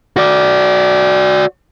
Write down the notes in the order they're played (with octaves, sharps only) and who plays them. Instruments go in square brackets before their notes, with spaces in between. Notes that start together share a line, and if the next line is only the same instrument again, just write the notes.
[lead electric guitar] F#4 D5